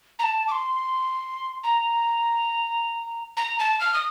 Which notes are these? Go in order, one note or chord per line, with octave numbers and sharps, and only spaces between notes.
A#5
A5
D6
C6
A#5
A#5
A5
F6
D#6